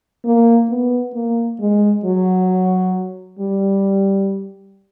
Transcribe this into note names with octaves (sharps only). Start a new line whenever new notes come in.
A#3
B3
A#3
G#3
F#3
G3